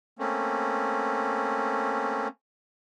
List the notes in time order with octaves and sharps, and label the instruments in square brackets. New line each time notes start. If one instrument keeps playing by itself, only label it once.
[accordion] A3 A#3 C4 C#4